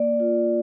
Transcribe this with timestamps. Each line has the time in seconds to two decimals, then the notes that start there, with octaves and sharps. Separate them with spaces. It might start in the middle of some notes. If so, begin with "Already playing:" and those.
Already playing: A#3 D5
0.20 F4